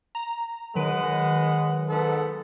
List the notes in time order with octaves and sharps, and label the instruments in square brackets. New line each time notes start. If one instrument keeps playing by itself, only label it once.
[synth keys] A#5
[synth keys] D#3 F#3 [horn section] G#3 B4 F#5
[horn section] G#2 B3 A4